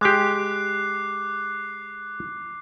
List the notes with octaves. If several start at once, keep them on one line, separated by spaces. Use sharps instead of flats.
G#3 G4 D6 F#6 C7